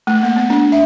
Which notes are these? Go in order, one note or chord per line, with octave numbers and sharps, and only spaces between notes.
A3
A#3
B3
D4
E5